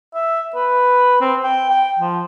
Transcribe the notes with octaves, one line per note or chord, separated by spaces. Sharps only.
E5
B4
C4
G5
G5
F3